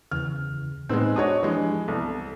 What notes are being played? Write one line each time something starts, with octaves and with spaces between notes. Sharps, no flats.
E2 C#3 E3 F6
A2 G#3 B3 C4 D#4 E6
D4 F#4 C#5 D#5 D#6
E3 F3 G#3 D4 G4
C2 B3 A4